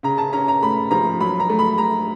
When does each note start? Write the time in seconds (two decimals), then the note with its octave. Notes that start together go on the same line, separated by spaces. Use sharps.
0.03 C#3 A#5
0.18 A5
0.33 C#4 A#5
0.48 A#5
0.62 A3 B5
0.91 F3 A#5
1.20 F#3 B5
1.40 A#5
1.50 A3
1.59 B5
1.78 A3 A#5